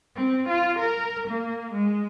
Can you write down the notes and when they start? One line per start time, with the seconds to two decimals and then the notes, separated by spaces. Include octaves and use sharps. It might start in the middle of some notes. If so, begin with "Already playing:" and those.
0.16 C4
0.49 F4
0.79 A#4
1.28 A#3
1.72 G#3